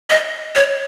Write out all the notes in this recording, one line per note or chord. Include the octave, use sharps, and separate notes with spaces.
D#5
C#5